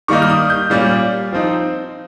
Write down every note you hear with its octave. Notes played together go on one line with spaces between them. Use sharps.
D#3 G3 A#3 D#4 C#6
F6
D#6
G6
A#2 G3 A#3 C#4
F3 C4 D#4